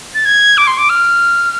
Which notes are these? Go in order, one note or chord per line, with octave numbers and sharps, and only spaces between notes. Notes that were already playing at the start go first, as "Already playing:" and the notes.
A6
G#6
D6
C6
D6
F6